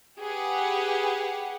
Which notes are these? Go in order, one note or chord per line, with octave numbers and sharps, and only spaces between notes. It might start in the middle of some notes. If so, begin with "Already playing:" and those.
G4 G#4 B4 F#5